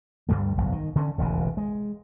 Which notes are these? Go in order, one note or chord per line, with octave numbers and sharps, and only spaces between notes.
D2 G2 G3 A3
F#1 B1 E2
D#3
D3 C#4
E1 A1 D#2 C#3
G#3